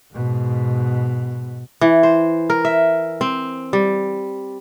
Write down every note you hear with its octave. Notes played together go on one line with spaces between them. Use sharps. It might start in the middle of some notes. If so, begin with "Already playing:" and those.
G#2 B2
E3
C5
A#4
E5
C4
G3